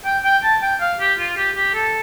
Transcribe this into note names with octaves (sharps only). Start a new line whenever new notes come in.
G5
G5
A5
G5
F5
G4
F4
G4
G4
A4